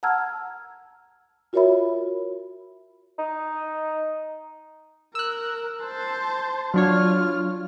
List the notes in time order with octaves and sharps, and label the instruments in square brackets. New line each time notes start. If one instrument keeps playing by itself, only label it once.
[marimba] F#5 A5 A#5 E6 F6 G#6
F4 F#4 A#4 C#5 E5 B5
[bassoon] D#4
[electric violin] A#4 [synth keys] E6 F#6
[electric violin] C5 A5
[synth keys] F#3 D4 C#5 [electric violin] F4 F6